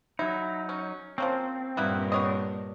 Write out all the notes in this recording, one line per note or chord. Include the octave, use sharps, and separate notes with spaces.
F#3 D#4 E4
C#4
F3 A#3 C4 C#4
G2 A#2 A#3 B3 E4
B3 C#5 D#5